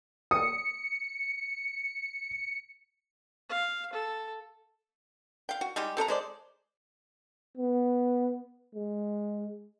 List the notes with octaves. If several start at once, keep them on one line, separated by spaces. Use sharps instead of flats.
D#6 C#7
F5
A4
F5 G5
F#4
G3 G#3 D#4 G4
C4 A4 D#5 A#5
G#3 C5 D5
B3
G#3